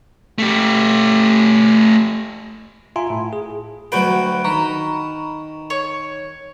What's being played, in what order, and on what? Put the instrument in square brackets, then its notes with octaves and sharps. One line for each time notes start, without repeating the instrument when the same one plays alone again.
[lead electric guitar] A3 G4
[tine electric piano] F4 E5 F5 G#5 A#5 C6
A2
G#4
[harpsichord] D2 F#3 G5 [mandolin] B4
[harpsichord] D#3 [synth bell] A#5 B5 C#6
[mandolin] C#5